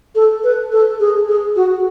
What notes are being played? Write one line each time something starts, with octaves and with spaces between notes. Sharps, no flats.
A4
B4
A4
G#4
G#4
F#4